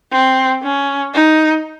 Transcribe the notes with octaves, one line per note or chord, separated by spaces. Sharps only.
C4
C#4
D#4